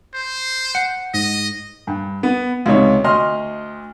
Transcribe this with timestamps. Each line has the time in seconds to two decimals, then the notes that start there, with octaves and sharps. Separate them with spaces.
0.14 C5
0.75 F#5 C#7
1.14 G#2 D#5
1.87 G2
2.23 B3
2.66 C#2 C3 D#4 C#5
3.04 D2 D#5 C6 F6